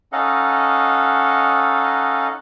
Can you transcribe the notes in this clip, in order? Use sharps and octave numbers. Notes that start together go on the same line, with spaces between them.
C#4 D#4 A4 D#5 F5 F#5